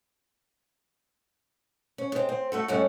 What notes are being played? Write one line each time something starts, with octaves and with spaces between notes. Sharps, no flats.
C#4
G#3 C4
C4
A3 F#4 A4
G2 F#3 G#3 A3 C#4